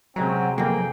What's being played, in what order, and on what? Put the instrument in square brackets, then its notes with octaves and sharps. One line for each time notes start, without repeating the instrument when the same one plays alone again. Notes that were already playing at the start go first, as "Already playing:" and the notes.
[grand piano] C3 G#3 A#5 [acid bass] F#3 [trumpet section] C4 C#4 G5
[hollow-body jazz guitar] B1 F2 [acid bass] A#3 [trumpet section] G#4 G5